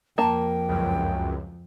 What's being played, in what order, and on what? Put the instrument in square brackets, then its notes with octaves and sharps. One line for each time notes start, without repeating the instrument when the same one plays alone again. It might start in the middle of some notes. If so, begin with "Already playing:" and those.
[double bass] F2 [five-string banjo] A#3 A5 [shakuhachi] G5
[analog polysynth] C#2 F#2